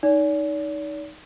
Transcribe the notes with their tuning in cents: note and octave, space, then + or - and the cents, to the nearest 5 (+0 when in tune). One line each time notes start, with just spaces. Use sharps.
D#4 +0 D5 -45